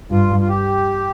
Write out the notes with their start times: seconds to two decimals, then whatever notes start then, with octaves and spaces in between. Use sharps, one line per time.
0.11 G2 F4
0.40 F4
0.49 G4